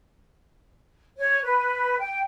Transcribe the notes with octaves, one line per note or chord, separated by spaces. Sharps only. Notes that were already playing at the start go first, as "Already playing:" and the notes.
C#5
B4
G5